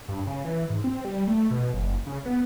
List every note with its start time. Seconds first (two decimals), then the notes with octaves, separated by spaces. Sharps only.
0.08 G2
0.27 C#3
0.44 E3
0.70 G#2
0.84 C4
1.05 G3
1.27 A3
1.51 B2
1.73 F#1
2.07 C#3
2.26 B3